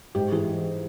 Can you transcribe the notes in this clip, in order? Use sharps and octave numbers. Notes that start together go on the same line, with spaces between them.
G#2 G4
E3 G#4